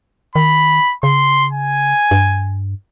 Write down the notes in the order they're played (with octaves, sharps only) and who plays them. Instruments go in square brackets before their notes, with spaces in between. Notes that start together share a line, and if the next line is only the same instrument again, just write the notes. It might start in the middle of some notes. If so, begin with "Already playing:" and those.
[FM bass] D#3 [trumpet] B5
[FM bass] C#3 [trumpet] C6
[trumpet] G#5
[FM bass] G2